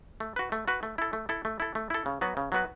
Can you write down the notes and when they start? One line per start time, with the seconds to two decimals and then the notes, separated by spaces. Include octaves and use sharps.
0.20 A3
0.36 F#4 B4
0.52 A3
0.68 F#4 B4
0.83 A3
0.98 E4 A4
1.13 A3
1.29 E4 A4
1.45 A3
1.60 E4 A4
1.75 A3
1.90 E4 A4
2.06 C#3
2.21 F#3 B3 F#4 B4
2.37 C#3
2.52 F#3 B3 F#4 B4